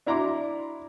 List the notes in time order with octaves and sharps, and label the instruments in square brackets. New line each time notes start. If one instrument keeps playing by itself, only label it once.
[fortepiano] D4 E4 A#5 C6 D6